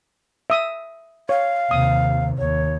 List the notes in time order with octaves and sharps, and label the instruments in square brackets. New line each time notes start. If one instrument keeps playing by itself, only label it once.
[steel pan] E5 D#6
[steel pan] C#5 [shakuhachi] F5
[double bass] D#2 C3 [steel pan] D#6
[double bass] D#2 [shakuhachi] C#5